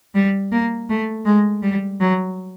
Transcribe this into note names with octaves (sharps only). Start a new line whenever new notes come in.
G3
A#3
A3
G#3
G3
F#3